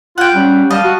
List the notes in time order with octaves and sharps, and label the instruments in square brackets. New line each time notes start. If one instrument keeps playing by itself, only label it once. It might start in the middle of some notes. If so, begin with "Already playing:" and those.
[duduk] F4 [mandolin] F#5 G5
[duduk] G3 [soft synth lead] C#4
[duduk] G3 [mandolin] D#5 A5 [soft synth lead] F5
[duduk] F#4